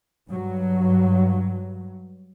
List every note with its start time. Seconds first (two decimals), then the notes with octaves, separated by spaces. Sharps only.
0.29 G2 F#3